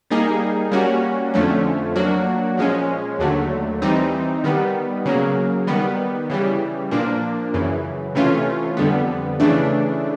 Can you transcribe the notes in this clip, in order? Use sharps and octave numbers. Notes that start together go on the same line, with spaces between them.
G3 A#3 D#4 G#4
G3 A#3 C#4 F#4
F2 D3 F3 A3 C#4
F#3 A#3 D4 F#4
A#2 F3 G#3 C#4
D#2 D3 F#3 A3
E3 G3 C4 D#4
D#3 G3 B3
C#3 F#3 A#3
D#3 G3 B3
C#3 E3 G3
A#2 F3 A#3 D4
F#2 C#3 E3
C3 E3 A3 C#4 F4
F2 D3 G3 B3
C#3 E3 A3 D4